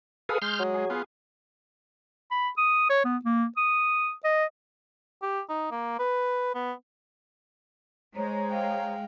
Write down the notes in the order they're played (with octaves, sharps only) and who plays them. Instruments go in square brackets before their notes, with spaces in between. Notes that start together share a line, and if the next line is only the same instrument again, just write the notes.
[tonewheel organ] G#4 A4 B4 [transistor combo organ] F5 D#6
[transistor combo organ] G#3 [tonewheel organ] C6 F6 G6
[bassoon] F#3
[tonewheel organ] G#4
[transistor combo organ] B3 F4
[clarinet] B5
D#6
C#5
B3
A#3
D#6
D#5
[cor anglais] G4
D#4
A#3
B4
B3
[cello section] G#3 [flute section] C5 C#5 A#5
[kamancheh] F5 G5